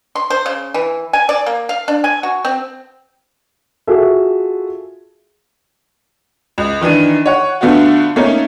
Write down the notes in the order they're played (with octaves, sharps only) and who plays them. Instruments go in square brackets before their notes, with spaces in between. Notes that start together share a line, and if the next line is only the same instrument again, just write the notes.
[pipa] C6
C5
C#3
E3
G#5
D5
A#3
F5
D4
G#5
F#4
C4
[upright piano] F4 F#4 G#4 A4 E5
[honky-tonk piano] C#2
D#3 E3 D4 D#7
C#5 F#5
D3 A3 B3 F4 F#4
A3 A#3 C#4 D#4